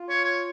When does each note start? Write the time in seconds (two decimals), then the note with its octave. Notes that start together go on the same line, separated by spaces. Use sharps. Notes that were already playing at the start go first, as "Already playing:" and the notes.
Already playing: F4
0.09 C#5
0.24 C#5